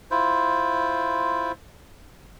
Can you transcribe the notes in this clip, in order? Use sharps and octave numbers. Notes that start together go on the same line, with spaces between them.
E4 F4 C5